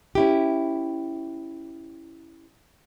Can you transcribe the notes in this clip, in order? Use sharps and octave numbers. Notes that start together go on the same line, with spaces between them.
C#4 E4 G4